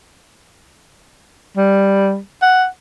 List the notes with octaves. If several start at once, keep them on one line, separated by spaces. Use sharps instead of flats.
G3
F#5